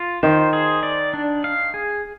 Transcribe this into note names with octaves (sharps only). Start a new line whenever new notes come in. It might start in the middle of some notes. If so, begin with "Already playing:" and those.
Already playing: F4 F5
D#3 C5
G#4
D5
D4
F5
G#4